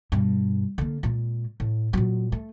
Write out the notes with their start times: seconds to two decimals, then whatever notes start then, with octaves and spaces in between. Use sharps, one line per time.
0.12 G2 B2
0.78 D3 A#3
1.03 A#2 G#3
1.60 A2
1.93 A#2 F#3
2.32 A3